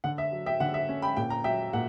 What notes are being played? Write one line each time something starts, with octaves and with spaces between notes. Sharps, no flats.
D3 F#5
E5
F#3
E5 G5
D3 F#5
E5
C#4
G5 B5
A#2 G5
A#5
F#3 E5 G5
A#2 F#5